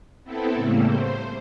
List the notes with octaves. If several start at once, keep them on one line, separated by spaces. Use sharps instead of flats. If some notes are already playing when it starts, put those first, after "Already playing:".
B3 C4 E4 A4
A2 C#3 G3 A3 A#3
C5